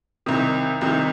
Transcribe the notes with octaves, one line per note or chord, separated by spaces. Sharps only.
C2 C3 D#3
C2 C3 D#3